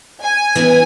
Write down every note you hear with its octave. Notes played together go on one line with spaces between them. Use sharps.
G#5
F#2 E3 B3